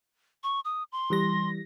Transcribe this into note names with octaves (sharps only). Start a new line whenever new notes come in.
C#6
D#6
C6
E3 G3 A#6